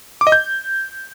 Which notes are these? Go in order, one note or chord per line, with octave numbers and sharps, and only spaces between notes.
D6
D#5
G6